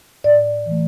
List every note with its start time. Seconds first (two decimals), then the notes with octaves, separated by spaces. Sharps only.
0.24 A2 D5
0.66 E3
0.71 A3